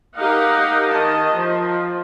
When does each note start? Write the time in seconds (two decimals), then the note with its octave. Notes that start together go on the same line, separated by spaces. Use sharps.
0.17 D#4 G4 A#4 D#5 F5 F#5
0.91 D#3 D#5 A5
1.34 F3